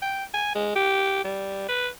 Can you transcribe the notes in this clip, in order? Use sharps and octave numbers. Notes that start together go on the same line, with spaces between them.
G5
G#5
G#3
G4
G3
B4